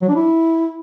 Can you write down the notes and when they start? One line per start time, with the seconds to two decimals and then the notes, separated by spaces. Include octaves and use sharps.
0.02 F#3
0.09 D4
0.16 E4